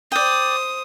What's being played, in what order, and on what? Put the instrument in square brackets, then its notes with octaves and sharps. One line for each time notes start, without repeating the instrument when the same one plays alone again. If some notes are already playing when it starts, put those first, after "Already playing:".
[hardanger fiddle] C5 D#6 [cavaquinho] D5 G5